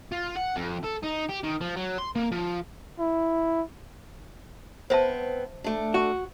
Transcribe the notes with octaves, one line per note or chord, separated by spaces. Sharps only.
F4
F#5
F2
A4
D#4
G4
D#3
F3
F#3
C6
A#3
F3
E4
B3 C4 C5 E5 A5
A3 D4
F#4